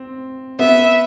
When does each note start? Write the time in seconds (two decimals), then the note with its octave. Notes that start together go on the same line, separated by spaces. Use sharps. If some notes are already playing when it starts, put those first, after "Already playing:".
Already playing: C4
0.59 B3 E5